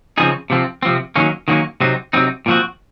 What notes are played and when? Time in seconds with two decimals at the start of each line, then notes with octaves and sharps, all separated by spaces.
0.18 C#3 F3 C4 D#4 G#4
0.50 C3 F3 C4
0.83 C3 F3 C4
1.16 D#3 F#3 A#3 C#4
1.48 D#3 F#3 A#3 C#4
1.80 C3 F#3 C4 D#4
2.13 C3 F#3 C4 D#4
2.46 A#2 F3 C4 F#4